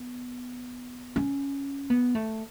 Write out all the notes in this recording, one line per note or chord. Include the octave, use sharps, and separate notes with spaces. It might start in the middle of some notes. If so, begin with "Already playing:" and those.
Already playing: B3
C#4
B3
A3